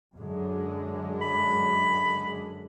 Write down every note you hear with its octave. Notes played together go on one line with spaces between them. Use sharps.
F#2 D3 G#3
B5